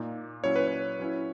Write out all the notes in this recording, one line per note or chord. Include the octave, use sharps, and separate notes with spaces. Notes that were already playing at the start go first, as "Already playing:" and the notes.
Already playing: A#2 A#3 D#4
A#2 F#3 C#4 E4 C#5
B4
C#5
F#3 C#4 E4